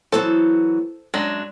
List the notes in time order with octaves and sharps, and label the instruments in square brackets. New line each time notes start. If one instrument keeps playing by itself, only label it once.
[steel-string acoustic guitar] E3 F#3 B3 [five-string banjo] A4 C5
[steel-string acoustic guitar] F#2 [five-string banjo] F#3 G#3 D4